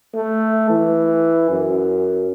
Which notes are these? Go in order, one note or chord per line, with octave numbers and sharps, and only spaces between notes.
A3
E3
F#2